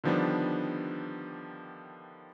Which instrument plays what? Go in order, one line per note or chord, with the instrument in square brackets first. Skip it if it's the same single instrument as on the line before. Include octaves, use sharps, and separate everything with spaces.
[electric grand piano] D3 D#3 F3 G3 B3 D4